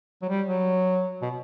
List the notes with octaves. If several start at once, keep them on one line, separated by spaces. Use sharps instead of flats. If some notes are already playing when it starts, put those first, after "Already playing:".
F#3
G3
F#3
B2